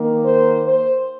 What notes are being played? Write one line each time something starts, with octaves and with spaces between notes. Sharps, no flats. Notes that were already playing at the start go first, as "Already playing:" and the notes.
Already playing: D#3 A#3
C5
C5